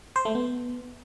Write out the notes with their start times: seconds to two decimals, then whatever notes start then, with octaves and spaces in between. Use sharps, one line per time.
0.16 C5
0.25 A3
0.35 B3